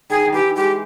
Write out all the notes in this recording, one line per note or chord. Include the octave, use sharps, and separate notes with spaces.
D#3 G#4
D#3
E3 G4
G#3 G4